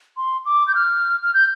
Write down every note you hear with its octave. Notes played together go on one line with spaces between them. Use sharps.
C6
D6
G6
F6
F6
G6